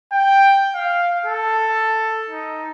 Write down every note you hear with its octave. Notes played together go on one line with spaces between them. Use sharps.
G5
F5
A4
D#4